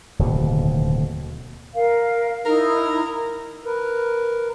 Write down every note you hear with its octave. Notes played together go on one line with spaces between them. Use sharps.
D1 D#2 B2 D3
A#4 F5
D#4 E4 A#4
A#4 B4